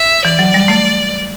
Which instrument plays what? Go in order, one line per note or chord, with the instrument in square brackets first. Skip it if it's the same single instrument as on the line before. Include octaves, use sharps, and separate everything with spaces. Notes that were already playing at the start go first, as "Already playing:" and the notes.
Already playing: [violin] E5
[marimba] E3 [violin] D5
[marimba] F#3
G3
A3